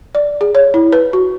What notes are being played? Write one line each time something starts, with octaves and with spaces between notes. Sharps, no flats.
D5
G#4
C#5
E4
B4
F#4